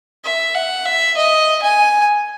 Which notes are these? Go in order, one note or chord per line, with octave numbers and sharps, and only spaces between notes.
E5
F#5
E5
D#5
G#5